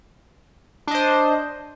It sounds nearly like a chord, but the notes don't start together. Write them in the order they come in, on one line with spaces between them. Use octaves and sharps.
D4 D#5 C5